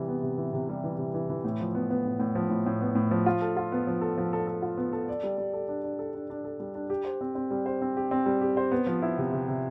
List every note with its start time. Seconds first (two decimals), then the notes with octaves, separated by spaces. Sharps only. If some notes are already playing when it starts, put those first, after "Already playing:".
Already playing: C3 E3 G3
0.08 B3
0.23 C3
0.38 E3
0.53 C3
0.69 G3
0.84 E3
0.98 C3
1.14 E3
1.30 E3
1.44 A2
1.60 F3
1.75 B3
1.90 B3
2.05 A2
2.20 A2
2.35 F3
2.50 A2
2.66 A2
2.81 B3
2.95 A2
3.11 F3
3.26 F4
3.41 A4
3.57 F4
3.72 B3
3.87 F3
4.01 A4
4.18 F3
4.33 A4
4.47 A4
4.62 F4
4.77 B3
4.93 A4
5.09 D5
5.23 G3
5.38 G3
5.54 A4
5.68 D4
5.84 D4
5.99 A4
6.14 D4
6.30 D4
6.44 A4
6.60 G3
6.75 D4
6.90 G4
7.05 C5
7.21 C4
7.35 C4
7.51 G3
7.66 C5
7.82 C4
7.97 G4
8.11 C4
8.26 G3
8.41 G4
8.57 C5
8.72 B3
8.87 F3
9.02 E4
9.18 C3
9.33 C3
9.48 C3